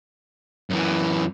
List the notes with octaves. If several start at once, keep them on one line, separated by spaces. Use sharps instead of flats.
F#2 E3